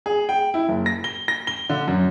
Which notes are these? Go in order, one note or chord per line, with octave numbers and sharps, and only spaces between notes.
G#4
G5
E4
F#1
A#6
G7
A#6
G7
D3
F#2